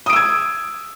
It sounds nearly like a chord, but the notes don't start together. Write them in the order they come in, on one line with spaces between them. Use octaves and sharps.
D#6 D7 E6 G#6